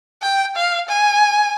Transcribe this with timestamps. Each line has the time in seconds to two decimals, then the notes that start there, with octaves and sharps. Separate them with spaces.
0.22 G5
0.56 F5
0.89 G#5